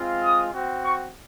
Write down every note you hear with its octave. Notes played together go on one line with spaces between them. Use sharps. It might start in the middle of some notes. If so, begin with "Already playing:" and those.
Already playing: G#3 C4 F4
D#6
C4 F#4
C#6